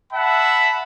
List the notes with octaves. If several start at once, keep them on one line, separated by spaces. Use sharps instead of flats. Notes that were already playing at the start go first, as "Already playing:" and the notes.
E5 F#5 A5 B5